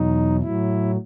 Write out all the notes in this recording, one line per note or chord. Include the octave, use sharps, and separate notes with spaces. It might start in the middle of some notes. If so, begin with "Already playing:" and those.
Already playing: E2 B2 F#3 D#4
A2 F#3 E4